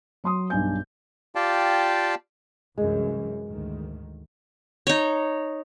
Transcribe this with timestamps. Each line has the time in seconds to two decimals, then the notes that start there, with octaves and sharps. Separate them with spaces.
0.24 F#3 C6 D#6
0.50 B1 G2 G#5 G6
1.35 F4 G4 D5 F5 G5 A5
2.78 C2 F#2 E3 G#3
3.48 D2 G#2 D#3
4.87 D#4 C#5